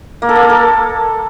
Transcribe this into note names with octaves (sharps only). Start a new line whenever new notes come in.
A#3
A4
A#3
A#4
A4